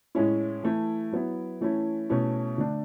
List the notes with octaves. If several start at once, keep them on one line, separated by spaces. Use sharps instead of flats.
A2 G#3 C#4 E4
E3 A3 E4
F#3 B3 E4
E3 A3 C#4 E4
B2 A3 C#4 E4
D3 A3 D4